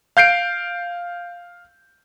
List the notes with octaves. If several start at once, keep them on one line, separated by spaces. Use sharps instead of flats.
F5 G6 C7 D7